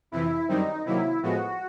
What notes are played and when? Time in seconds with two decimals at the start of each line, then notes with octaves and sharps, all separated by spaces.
0.12 F2 C3 E3 E4
0.48 F#2 D#3 G3 C4 D#4
0.85 C3 D#3 F#3 A#3 E4
1.22 A2 F3 G#3 B3 F#4